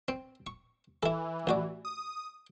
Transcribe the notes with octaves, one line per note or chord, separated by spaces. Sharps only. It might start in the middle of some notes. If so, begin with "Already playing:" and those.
C4
C#6
E3 E4 A4
A1 F#4 D5
D#6